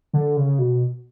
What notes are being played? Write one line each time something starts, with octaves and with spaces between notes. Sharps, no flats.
D3
C#3
B2